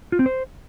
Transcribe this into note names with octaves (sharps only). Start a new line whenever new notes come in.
F4
C4
C5